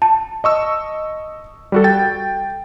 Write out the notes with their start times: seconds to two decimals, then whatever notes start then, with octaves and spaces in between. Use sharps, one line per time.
0.02 A5
0.44 D#5 C#6 E6
1.72 G3 F#4 A4
1.84 G5 A6